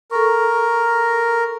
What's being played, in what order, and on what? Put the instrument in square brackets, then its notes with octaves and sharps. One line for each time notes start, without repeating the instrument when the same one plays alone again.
[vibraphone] A4 C#6 [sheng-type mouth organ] A#4